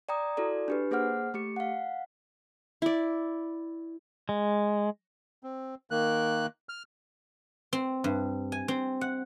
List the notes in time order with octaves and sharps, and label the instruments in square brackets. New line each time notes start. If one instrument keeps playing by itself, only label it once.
[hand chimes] D5 G5 A#5 D#6
E4 F#4 A4 D5
D4 G4 B4
A#3 G#4 C5 F#5 F6
A3 G4 C#7
F5 F#5
[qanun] E4 D5
[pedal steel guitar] G#3
[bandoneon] C4
D#3 A#3 F#6
F6
[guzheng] C4
G2
G#5
C4
F#5